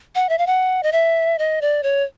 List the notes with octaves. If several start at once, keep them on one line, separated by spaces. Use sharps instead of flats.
F#5
E5
F5
F#5
D#5
E5
D#5
D5
C#5